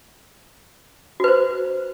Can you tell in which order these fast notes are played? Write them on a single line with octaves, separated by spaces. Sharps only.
F#4 B4 C5